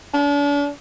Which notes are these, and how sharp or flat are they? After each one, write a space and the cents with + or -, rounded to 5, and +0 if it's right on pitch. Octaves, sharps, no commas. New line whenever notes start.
D4 -40